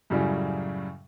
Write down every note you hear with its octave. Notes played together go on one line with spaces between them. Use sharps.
F#2 A2 C#3 F#3 G3